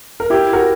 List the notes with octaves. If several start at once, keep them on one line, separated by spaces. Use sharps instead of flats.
A#4
E4 G4
F#4 A#4